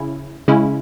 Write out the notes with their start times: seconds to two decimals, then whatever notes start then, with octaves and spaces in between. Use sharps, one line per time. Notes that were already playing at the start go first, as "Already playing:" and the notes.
Already playing: C#3 C#4 E4
0.48 C#3 G#3 C#4 E4